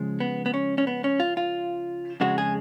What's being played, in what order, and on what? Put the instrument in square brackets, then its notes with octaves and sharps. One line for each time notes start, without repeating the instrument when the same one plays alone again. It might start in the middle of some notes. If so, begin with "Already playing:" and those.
Already playing: [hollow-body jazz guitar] C#3 F3 G#3
B3
B3
C#4
C#4
B3
C#4
F4
F4
F2 C#3 G#3 F#4
G#4